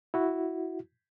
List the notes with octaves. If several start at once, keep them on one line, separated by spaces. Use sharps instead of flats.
E4 F#4